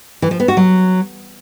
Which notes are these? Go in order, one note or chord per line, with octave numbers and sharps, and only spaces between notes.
E3
F3
B3
F#4
F#3